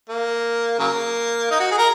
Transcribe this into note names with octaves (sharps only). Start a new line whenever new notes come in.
A#3
C#3 F#3 A#3
D#4
F#4
G#4
A#4